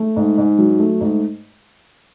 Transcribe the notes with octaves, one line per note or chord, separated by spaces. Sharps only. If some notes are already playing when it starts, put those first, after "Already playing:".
Already playing: A3
G#2
G#2
F#3
A3
G#2